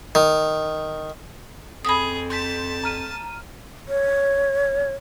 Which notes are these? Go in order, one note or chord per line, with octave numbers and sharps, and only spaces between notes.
D#3
F2 G#4 B5 D#6
A5 C6 G6 B6
A#5 F6 D#7
C#5